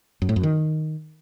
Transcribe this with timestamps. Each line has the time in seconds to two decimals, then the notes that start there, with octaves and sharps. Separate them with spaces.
0.22 F#2
0.29 A2
0.36 F#2
0.43 D#3